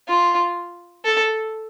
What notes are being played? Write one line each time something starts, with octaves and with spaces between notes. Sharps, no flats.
F4
A4